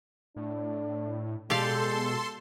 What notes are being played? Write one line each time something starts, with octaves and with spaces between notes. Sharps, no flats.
A2 D4
B2 G#3 G4 A4 D5 F5 C6